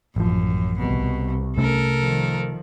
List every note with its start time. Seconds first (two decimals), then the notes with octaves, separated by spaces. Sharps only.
0.16 A1 F#2 F3
0.79 C2 B2
1.58 C3 A3 C#4 A4 A#4
2.01 D#3 F3